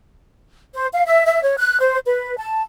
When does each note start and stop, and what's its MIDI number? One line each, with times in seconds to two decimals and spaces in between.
0.73 0.87 72
0.92 1.05 77
1.06 1.22 76
1.26 1.43 76
1.43 1.55 73
1.56 1.76 90
1.80 1.98 72
2.05 2.37 71
2.37 2.60 81